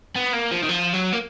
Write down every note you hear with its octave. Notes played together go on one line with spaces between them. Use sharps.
B3
A#3
F3
D#3
F3
F#3
A#3